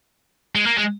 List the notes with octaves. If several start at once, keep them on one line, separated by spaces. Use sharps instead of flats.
G#3
A#3
G#3